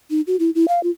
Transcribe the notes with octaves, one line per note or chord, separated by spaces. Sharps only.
D#4
F#4
E4
E4
F5
F4